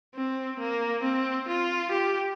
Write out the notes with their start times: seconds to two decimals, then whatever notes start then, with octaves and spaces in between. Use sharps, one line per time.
0.16 C4
0.60 A#3
1.03 C4
1.48 F4
1.92 G4